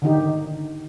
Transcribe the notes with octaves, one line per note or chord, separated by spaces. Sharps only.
D3 D#3 D#4 G4